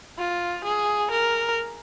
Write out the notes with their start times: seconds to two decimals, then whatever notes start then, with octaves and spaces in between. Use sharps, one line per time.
0.18 F4
0.64 G#4
1.11 A#4